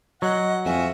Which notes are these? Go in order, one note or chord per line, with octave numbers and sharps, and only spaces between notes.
F#3 D#5 F#5
F2 F4 F#4 E5 G#5